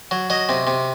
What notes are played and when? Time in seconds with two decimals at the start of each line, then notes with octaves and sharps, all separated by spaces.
0.11 F#3
0.30 F#3 D#5
0.49 C3
0.67 C3